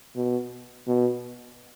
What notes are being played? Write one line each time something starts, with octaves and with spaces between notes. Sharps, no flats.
B2
B2